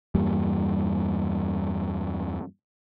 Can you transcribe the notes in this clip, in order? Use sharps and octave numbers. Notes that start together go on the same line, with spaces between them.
E2 G2 G3 A#3